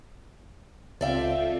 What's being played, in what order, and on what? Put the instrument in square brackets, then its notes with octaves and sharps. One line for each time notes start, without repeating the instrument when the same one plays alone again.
[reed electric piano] C#2 F5 [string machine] C4 F4 A4 [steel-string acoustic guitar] D5 E5 G5